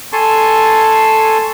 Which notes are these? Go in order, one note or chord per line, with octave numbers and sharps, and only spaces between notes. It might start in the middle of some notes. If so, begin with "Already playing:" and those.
A4 G#5 A5 C6 C#6